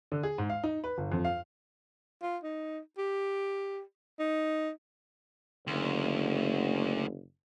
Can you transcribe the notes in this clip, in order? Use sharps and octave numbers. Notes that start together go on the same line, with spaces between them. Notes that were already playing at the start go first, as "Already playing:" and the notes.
D3
G#4
G#2
F5
D#4
B4
G1
F2
F5
F4
D#4
G4
D#4
F#1 D2